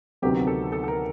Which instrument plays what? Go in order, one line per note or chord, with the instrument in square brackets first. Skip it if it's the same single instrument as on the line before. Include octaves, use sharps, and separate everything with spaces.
[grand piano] D2 C3 D#3 F#3 B3 [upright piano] G4
[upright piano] A4
A4
A4
A#4